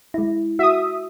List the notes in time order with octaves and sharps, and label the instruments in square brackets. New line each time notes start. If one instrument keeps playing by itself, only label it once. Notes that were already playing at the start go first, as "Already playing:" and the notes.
[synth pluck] G#3 E4
[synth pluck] F#4 [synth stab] E5 D#6